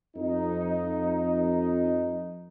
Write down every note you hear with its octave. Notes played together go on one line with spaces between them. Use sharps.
F2 D#4